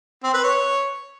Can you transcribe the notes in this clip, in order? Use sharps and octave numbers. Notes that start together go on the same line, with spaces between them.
C4
B4
C#5